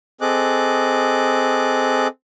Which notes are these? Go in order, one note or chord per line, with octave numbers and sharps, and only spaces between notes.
C4 G#4 A4 D#5 D6 F#6